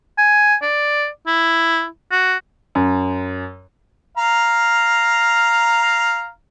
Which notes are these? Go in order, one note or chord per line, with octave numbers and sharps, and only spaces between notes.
G#5
D5
E4
F#4
F#2
F5 A#5